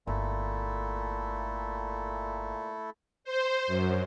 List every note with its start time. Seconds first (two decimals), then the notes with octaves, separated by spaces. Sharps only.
0.07 G1 A#2 A3 E4 A4
3.24 C5
3.67 F#2